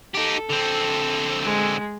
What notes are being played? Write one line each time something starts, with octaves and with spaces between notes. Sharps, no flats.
D#4 G4 A4
D3 C4
G#3